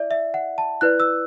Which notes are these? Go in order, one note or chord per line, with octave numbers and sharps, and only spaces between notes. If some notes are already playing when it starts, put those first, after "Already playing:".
Already playing: E4 D5 E5
E5
F#5
A5
E4 B4 D5 F#6
E6